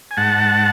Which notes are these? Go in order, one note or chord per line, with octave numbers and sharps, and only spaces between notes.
G#5
G#2 F#5 A5